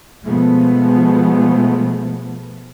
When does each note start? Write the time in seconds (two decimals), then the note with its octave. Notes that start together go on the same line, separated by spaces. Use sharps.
0.25 B2 F3 G#3 A3 B3